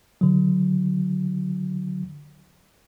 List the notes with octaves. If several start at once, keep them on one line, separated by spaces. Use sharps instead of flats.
D3 F#3